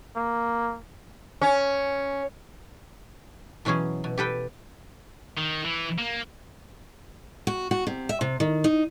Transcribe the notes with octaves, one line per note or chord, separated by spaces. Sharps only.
A#3
C#4
B2 E3 F#3 C#4 G#4
B2
G4 A4 B4 G5
D#3
E3
A#3
F#4
F#4
C3
E5
C3
D#3
D#4